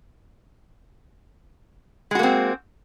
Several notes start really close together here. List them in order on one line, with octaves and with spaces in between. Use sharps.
G#3 F#4 A#3 C4